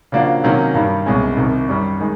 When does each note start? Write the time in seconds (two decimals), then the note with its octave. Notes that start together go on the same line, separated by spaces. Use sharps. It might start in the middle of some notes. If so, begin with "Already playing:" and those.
0.12 C#3 F3 A#3 D4 F#4
0.44 C3 D#3 F#3 A#3 C#4
0.74 G2 D#3 G3
1.06 C2 B2 G#3 C#4
1.37 C2 C3 D#3
1.69 F#2 D#3 G3
2.00 D#3 G#3